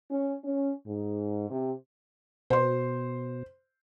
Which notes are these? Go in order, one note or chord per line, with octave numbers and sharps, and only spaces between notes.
C#4
C#4
G#2
C3
B2 C5 C6